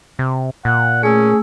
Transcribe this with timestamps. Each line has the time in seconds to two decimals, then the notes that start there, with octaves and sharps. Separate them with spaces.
0.19 C3
0.65 A#2 F#5
1.03 A3 C#4 G#4 E6